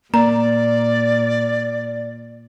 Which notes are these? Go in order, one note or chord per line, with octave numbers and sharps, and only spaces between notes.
A#2 A#3 D5 A#5